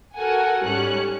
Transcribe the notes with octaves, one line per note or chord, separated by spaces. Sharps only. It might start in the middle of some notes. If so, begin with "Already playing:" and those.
F#4 A4 A#4 F#5 G#5
G#2 G3 C#4 A4 F#6 C#7